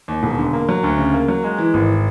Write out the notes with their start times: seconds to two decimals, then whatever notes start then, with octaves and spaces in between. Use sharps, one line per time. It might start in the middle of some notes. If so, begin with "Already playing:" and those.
0.08 D#2
0.23 E1
0.38 D3
0.53 A#3
0.69 F#3
0.84 D2
0.98 C#3
1.14 A#3
1.28 F#3
1.44 G#3
1.58 E3
1.74 G#1